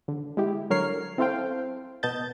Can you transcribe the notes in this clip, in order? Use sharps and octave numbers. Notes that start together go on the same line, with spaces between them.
D3
G#3 E4 G4
D3 F#3 A#4 C#5 F6 C7
C4 E4 A4 C5 F5 G5
B2 B3 D#5 A5 G6 A6